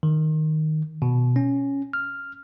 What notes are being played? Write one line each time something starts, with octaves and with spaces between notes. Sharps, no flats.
D#3
B2
C#4
F6